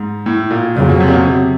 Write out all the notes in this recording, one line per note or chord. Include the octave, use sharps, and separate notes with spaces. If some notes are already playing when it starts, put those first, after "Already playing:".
Already playing: G#2
A2
A#2
F2 A#2 C#3 F#3
B2
C3
A#2
B2
C3